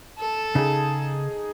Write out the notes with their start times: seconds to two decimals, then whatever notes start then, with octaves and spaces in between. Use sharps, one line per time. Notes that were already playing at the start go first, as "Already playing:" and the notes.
0.18 A4 A5
0.55 C#3 D#4 G#4